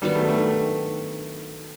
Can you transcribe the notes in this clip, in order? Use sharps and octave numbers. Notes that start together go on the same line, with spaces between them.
D#3 F#3 G3 B3
A3
A3